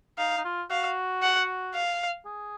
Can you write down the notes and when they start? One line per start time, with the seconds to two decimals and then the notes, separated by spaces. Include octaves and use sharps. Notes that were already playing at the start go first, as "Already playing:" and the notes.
0.18 D#4 F5
0.38 D#4
0.45 F4
0.70 F#4 F5
1.23 F#5
1.75 F5
2.25 G#4